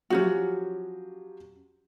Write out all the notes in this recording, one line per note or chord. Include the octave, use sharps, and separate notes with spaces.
F3 F#3 C#4 D#4 F#4 G4